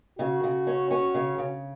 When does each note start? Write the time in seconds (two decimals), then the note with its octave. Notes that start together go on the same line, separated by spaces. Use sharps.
0.19 C#3 F#4
0.44 C#3
0.67 C#4
0.91 C#4
1.14 C#3
1.38 C#3